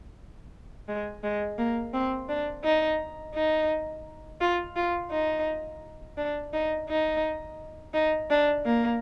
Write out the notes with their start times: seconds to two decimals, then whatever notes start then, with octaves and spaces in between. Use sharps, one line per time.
0.88 G#3
1.24 G#3
1.58 A#3
1.94 C4
2.29 D4
2.64 D#4
3.34 D#4
4.41 F4
4.76 F4
5.11 D#4
6.18 D4
6.53 D#4
6.89 D#4
7.94 D#4
8.30 D4
8.65 A#3